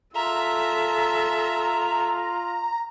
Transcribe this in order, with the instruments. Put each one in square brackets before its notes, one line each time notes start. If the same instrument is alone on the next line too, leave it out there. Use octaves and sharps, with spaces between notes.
[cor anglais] F4 [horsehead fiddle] A4 [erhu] E5 [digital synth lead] A#5